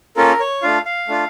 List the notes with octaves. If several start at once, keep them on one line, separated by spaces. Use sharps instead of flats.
A#3 C#4 F4 A4 A#4
C#5
A3 D4 F4 F5
F5
A3 D4 F4